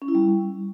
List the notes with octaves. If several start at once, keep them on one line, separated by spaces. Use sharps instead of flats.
C#4
E4
G3